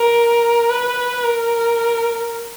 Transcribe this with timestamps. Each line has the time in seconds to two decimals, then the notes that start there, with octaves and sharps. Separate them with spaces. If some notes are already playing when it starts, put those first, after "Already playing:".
Already playing: A#4
0.70 B4
1.23 A#4